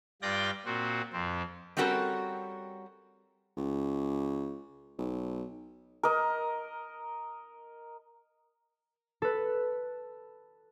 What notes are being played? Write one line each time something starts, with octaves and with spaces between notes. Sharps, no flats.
G2 F4 D5 G5 G6 A#6
A#2 C4 F#4
F2 C4
G3 C4 C#4 F#4 A4 A#4
C#2
B1
A#4 D#5
A4 B4